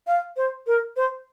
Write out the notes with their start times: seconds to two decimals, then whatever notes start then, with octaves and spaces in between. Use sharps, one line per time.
0.07 F5
0.37 C5
0.67 A#4
0.96 C5